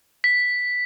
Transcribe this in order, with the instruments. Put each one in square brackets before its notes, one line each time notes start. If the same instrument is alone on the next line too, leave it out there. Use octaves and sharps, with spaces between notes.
[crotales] B6